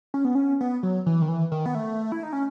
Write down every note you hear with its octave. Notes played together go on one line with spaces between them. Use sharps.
C#4
B3
C#4
B3
F#3
E3
D#3
E3
D#3
B3
A3
E4
D#4
C#4